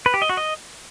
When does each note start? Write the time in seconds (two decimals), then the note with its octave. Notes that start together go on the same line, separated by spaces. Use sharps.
0.06 B4
0.14 G4
0.22 D#5
0.29 F#4
0.37 D#5